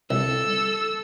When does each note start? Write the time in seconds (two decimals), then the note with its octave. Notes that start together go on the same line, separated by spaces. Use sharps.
0.11 C2 A4 E6